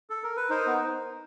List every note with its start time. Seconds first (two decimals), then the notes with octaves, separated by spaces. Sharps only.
0.10 A4
0.23 A#4
0.37 B4
0.50 D#4 A#4 C5
0.67 B3